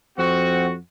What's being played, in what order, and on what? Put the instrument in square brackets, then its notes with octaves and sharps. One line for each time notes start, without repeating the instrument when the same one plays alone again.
[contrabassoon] F2 [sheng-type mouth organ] C4 F#5 [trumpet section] F#4